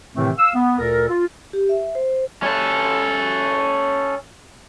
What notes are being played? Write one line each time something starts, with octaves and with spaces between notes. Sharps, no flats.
A2 C3 D#3 E3 A3 C4
F5 E6
B3
D2 A#2 A4 A#4
F4
G4
E5
C5
C#4 A4